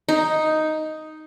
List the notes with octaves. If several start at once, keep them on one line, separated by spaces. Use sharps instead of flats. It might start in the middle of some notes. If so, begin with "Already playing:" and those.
D#4